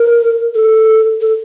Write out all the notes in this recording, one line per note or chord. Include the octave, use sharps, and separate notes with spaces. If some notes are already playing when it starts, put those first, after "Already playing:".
Already playing: A#4
A4
A4